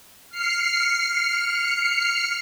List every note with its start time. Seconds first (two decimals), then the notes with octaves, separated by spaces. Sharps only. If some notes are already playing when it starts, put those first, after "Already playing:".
0.30 F6 C7 C#7